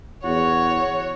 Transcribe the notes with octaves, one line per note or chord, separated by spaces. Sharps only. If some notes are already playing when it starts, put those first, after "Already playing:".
E2 F#4 C#5